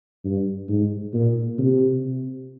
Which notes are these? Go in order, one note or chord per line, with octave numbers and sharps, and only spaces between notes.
G2
G#2
A#2
C3